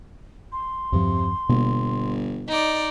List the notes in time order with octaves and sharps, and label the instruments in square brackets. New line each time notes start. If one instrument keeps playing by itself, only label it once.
[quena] C6
[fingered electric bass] E2 G2 F3 [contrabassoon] C3
[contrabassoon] G1 [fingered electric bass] B2 A#3
[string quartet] D#4 D5 [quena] D#5